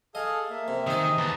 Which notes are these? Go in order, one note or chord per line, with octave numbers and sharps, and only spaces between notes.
G#4 A4 D#5 F5
A#3 E5
C3
C3 D#3 G#4 D#5
D#2 B4 A5 A#5